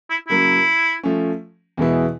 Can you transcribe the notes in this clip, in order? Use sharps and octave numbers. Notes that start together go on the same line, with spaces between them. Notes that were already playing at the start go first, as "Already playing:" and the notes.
E4
C#3 F#3 A#3 E4
F3 A3 C#4
E2 B2 G#3 B3 E4